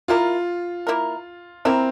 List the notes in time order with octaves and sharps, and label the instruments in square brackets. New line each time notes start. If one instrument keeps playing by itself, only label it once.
[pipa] A#3 E4 A#4 [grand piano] F4
[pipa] A#3 E4 A#4
[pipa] A#3 E4 A#4 [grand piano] C4